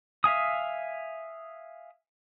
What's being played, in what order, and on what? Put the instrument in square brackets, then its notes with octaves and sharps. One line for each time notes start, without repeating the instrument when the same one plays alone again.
[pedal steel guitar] E5 F5 G#5 D#6